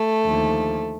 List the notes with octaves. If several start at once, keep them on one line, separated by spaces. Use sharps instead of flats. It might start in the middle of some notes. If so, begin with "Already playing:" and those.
Already playing: A3
D#2 D3 F3